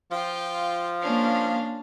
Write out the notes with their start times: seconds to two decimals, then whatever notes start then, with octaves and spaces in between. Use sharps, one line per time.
0.11 F3 F4 G5
1.02 A#3 C#4 D4 F5